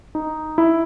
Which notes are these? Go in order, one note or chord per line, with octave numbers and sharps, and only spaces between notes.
D#4
E4